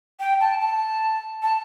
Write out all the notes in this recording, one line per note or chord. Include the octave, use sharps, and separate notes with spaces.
G5
A5
A5
A5